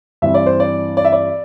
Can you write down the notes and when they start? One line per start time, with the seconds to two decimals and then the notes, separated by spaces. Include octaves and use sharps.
0.22 G2 E3 C4 E5
0.34 D5
0.46 C5
0.60 D5
0.97 D5
1.05 E5
1.12 D5